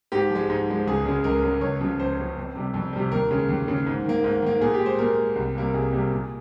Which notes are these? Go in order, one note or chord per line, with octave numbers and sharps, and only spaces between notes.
G#2 G4
F3 G#3
G#2
F3 G#3
C#2 G#4
C#3 G#3
C#2 A#4
C#3 G#3
C#2 C#5
C#3 F3
C#2 C5
C#3 F3
F2
C3 G3
F2
C3 G3
D#2 A#4
C#3 G#3
D#2
C#3 G#3
G#2
D#3 A#3
G#2
D#3 A#3
A#2 G#4
G4
G#3
C5
A#2 A#4
G#3
C2
C3 G3 A#3
C2 G#4
C3 G3 A#3
A#2